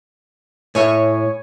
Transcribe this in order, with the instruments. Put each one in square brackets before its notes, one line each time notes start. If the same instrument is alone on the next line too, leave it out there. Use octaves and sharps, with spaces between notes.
[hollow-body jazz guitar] A2 E5 [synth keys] C#5 G#5